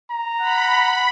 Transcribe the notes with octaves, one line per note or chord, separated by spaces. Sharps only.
A#5
F#5 B5